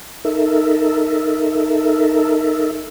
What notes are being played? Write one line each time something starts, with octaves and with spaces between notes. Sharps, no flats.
D#4 A4 A#4 E5